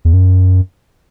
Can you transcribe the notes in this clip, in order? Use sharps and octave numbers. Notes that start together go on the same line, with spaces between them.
E2
F#2